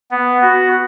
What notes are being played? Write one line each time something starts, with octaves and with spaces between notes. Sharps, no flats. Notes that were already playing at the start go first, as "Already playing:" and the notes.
B3
F#4